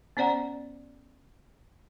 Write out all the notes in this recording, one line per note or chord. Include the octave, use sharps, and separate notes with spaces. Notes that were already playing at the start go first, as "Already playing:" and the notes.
B3 C#4 C5 D5 F#5 A#5